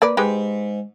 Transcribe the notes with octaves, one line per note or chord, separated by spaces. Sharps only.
A#3 B4 D5
G#2 G#3 G4 B4